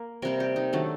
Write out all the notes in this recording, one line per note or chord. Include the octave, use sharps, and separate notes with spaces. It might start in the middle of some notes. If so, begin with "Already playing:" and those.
Already playing: A#3
C3 G3 A#3 A#4
G4
D#4
D#3 F#3 A3 D4